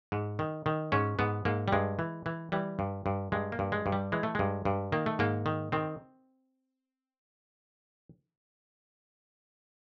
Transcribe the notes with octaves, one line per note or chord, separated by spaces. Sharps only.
G#2
D#3
D#3
G#2 C#4
G#2 B3
G#2 A#3
G3
G2 G#3
E3
E3
E3 G3
G2
G2
G2 G#3
A#3
G2
G#3
G2
G3
E3 G#3
A3
G2 G#3
G2
D#3 A#3
A3
G#2 A#3
D#3
D#3 C4